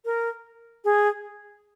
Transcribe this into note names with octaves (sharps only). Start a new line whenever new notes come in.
A#4
G#4